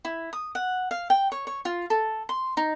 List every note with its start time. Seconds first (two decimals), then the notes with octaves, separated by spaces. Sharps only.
0.05 E4
0.33 D#6
0.55 F#5
0.91 F5
1.10 G5
1.32 C#5
1.47 C#5
1.65 F4
1.90 A4
2.29 C6
2.57 D#4